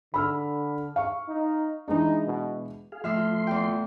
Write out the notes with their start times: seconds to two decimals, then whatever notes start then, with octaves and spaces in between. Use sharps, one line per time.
0.14 D3 B5 E6 F6
0.96 F5 C#6
1.28 D#4
1.88 E3 G#3 D4 D#4
2.27 B2
2.92 G#4 F5
3.04 A2 F3 E5 C6 F6
3.47 E2 G5